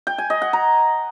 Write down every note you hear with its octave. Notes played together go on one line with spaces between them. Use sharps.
G5
G#5
D#5
F#5
A#5